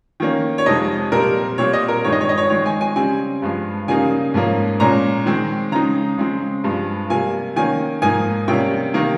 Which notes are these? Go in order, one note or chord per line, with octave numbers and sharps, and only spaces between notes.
D#3 A#3 C#4
C#5
F2 C3 F3 G#3 D#4 D#5
A#2 G3 C4 A#4
A#2 G3 C4 C#5
D#5
A#4
G2 D#3 G#3 D#4 C#5
D#5
C#5
D#5
C#5
D#3 G#3 C4 C#5
G#5
G#5
C#3 G3 C4 G#5
G2 F3 G#3
C#3 G3 A#3 D#4 G#5
G#2 F3 A#3 C#4
A#2 G#3 C#4 A#5
D#3 G#3 C4
C#3 G#3 D#4 A#5
C#3 G#3 C4
G2 F3 G#3
C3 G3 A#3 G#5
D#3 A#3 C#4 G#5
G#2 F3 A#3 D#4 G#5
C3 G3 A#3 C#4 G5
C3 D#3 A#3 D#4